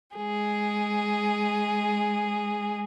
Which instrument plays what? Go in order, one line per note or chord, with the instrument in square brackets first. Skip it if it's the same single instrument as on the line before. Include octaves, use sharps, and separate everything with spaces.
[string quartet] G#3 G#4